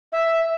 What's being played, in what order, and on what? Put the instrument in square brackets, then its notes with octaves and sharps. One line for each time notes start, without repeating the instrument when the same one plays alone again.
[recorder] E5